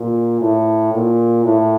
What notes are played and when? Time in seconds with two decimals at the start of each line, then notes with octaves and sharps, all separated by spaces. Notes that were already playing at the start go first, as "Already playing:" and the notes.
Already playing: A#2
0.41 A2
0.92 A#2
1.45 A2